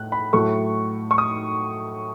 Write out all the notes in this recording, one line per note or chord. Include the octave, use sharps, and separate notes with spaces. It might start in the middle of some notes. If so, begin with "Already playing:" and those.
Already playing: A2 F#6
B5
A2 F#3 A3 C#6
C#6
D#6